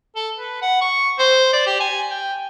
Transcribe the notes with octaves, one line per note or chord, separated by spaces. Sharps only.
A4
B4
F#5
C#6
C5
D5
G4
G#5
G5